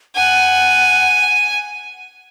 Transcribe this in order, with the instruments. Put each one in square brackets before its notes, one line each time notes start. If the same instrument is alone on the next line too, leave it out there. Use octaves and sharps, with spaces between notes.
[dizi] F#5 [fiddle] G#5